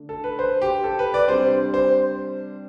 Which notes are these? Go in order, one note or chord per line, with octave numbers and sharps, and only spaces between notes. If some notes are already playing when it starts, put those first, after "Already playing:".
Already playing: D3 A3 D4
A4
B4
C5
G4
A4
B4
D5
C3 G3 D4 C5
C5